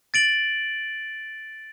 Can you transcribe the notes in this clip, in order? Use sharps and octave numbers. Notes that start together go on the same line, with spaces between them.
A6 D7 F#7